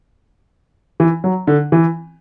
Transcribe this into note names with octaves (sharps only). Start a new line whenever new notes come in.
E3
F#3
D3
E3